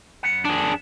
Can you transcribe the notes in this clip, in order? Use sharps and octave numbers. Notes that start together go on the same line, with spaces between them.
F#2 B3 F#5
D4 G#4